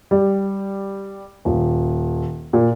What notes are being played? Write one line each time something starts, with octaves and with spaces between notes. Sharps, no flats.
G3
D#1
A#2